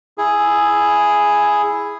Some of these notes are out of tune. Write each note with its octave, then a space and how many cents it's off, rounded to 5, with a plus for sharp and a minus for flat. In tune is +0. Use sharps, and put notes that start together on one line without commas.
E4 +0 G#4 +0